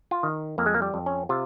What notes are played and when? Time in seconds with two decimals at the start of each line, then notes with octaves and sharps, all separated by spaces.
0.11 F4
0.23 D#3
0.58 F2 A#3
0.66 G#3
0.74 A#3
0.82 G3
0.94 F2
1.06 C#4
1.29 C3 F4